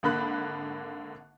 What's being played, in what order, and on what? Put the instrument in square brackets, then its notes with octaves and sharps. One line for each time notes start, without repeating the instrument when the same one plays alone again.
[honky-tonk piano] G#1 D3 A#3 B5 F#6